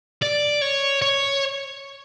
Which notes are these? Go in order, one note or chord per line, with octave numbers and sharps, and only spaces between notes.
D5
C#5
C#5